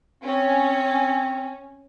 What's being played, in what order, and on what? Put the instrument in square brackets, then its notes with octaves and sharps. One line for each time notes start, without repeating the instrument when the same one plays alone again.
[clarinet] C4 [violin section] C#4